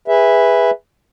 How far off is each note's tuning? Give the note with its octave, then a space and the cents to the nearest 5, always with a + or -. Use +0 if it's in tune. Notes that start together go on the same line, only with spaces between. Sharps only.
G#4 -20 B4 +0 E5 +0